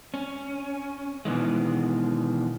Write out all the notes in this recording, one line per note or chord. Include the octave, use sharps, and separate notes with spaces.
C#4
B2 D#3 E3 G#3